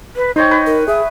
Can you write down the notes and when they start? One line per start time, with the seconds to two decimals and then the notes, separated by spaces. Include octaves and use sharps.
0.16 B4
0.36 D#4 C5 C#5 D#5 G5
0.51 B4
0.66 A#4
0.88 G#4 E5 D#6